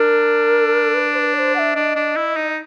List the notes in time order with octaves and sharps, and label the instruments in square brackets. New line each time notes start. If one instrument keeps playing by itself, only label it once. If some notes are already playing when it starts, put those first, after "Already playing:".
Already playing: [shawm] D4 [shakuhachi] A#4
[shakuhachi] B4
C5
B4
D5
C5
F#5
E5
[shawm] D4 [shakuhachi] D#5
[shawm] D4
E4
D#4